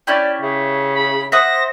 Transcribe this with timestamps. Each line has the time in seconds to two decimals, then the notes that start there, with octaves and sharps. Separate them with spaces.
0.07 C#4 E4 G4 D5
0.41 C#3 E5
0.94 B5
1.32 C5 E5 F#5 D#6 A#6